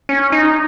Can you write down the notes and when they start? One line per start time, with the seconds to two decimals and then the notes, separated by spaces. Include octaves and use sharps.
0.09 C#4
0.32 D#4